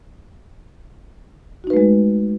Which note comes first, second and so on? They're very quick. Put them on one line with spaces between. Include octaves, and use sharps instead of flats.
F#4 D#4 B4 A3 G#3